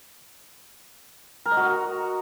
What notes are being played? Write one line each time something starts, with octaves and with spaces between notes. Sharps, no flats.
A#4
D#5
F#4